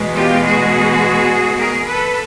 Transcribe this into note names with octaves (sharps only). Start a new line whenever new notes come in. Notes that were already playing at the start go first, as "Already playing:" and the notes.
Already playing: E2 B2 G#3 B3
F4 G4
F#4 G#4
G#4 A#4
A4 B4